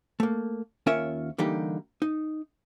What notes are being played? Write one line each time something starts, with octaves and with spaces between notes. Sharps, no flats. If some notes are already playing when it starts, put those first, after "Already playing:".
A3 A#3
D#2 C#4 F4 A#4 C#5 E5
D3 E3 G3 A#3 D#4 G4
D#4